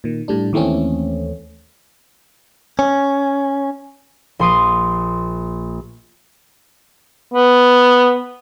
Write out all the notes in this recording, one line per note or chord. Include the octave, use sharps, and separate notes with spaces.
A#2 D#3
A2 G3 D4
D#2 E3 A3 C4 C#4
C#4
A#1 C6 D#6 D#7
B3